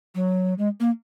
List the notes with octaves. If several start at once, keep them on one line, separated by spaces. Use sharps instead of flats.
F#3
G#3
A#3